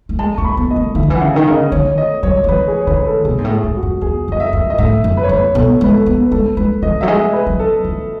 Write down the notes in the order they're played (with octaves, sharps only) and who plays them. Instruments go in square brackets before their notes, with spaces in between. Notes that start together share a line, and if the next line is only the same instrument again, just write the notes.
[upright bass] A3
[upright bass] G#3 [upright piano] A5
[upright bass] A3 [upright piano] C#6
[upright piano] B5
[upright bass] B3
[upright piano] D#5
[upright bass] A3
[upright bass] E3 [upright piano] E5
[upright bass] D#3
E3
[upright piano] F#5
[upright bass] C#3
[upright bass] D#3 [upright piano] D#5
[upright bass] C#3
[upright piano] D#5
[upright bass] D#3 [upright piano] C#5
[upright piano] D#5
[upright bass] F#3 [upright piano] C#5
[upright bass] F#3
[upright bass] E3 [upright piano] B4
[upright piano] G#4
C#5
[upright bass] D#3 [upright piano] B4
[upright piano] B4
A4
[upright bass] B2 [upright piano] G#4
[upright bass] G#2
A2
[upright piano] G#4
[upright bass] G#2
[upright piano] F#4
[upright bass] F#2
[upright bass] E2 [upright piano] G#4
[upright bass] F#2 [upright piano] D#5
[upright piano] E5
[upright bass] F#2
[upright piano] D#5
[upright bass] A2 [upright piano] E5
[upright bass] F#2
[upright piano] B4
C#5
[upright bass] F#2 [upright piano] B4
[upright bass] B2 [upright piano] A4
[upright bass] G#3 [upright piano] B4
[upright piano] A4
[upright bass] B3
[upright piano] B4
[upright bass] G#3 [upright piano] A4
[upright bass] G#3 [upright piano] B4
[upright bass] E3 [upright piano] D#5
[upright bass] F#3 [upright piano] E5
[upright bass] G#3 [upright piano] D#5
[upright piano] B4
[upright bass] F#3
[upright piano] A4
[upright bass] E3